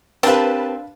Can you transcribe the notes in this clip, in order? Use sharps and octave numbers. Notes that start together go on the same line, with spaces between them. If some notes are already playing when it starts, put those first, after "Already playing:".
C4 D4 G4 A#4 B4 F5 A5